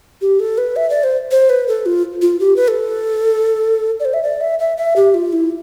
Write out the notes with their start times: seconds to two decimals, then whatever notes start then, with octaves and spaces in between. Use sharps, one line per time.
0.21 G4
0.40 A4
0.58 B4
0.76 E5
0.90 D5
1.04 C5
1.31 C5
1.50 B4
1.68 A4
1.86 F4
2.22 F4
2.40 G4
2.56 B4
2.68 A4
4.00 D5
4.05 C5
4.14 E5
4.23 D5
4.41 E5
4.59 E5
4.77 E5
4.96 G4
5.14 F4
5.33 E4